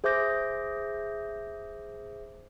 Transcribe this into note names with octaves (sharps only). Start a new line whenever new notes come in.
G#4 C5 E5 D6 G6 A#6